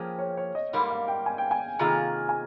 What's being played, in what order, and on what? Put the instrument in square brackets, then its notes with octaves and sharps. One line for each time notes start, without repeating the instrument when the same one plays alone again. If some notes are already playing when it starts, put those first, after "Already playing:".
Already playing: [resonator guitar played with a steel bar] F3 A#3 C#4 G#4 [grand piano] G5
[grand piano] C#5
C#5
D#5
[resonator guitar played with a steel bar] G#2 G3 A#3
[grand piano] F5
G5
G#5
G5
G#5
[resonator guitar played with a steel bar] C3 D#3 A#3 F4 G#4
[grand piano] G#5